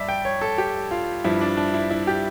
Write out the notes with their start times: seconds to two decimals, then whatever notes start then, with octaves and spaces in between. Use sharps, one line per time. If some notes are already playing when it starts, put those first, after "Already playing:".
Already playing: G2 D5 E5
0.09 G5
0.25 C#5
0.41 A4
0.58 G4
0.91 F4
1.24 G2 F3 E4
1.41 D4
1.57 D4
1.74 E4
1.91 E4
2.07 G4